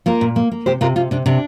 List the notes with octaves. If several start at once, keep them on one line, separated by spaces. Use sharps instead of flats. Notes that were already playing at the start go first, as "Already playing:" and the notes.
A#3 F4 A#4
A#2
A#3
A#3
C3 G4 C5
C3 F4 A#4
C3 F4
C3 D4
C3 D4